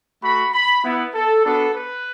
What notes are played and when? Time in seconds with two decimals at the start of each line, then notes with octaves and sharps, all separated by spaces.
0.22 A3 F#4 B5
0.53 B5
0.84 B3 E4
1.14 A4
1.44 B3 D4 F#4 A4
1.75 B4